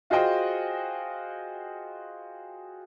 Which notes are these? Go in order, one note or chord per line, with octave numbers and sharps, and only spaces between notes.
F4 F#4 G#4 C5 D#5 G5